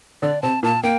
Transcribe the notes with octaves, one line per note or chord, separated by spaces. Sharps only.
D3 D4 D5
C3 C4 A5
A#2 A#3 A5
A#3 G5